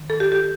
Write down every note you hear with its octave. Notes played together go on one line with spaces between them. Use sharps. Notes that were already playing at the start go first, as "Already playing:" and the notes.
Already playing: D#3
A4
G4
G4